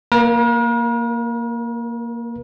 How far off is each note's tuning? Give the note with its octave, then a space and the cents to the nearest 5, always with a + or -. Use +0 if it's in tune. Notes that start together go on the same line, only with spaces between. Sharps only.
A#3 +0 A#4 +45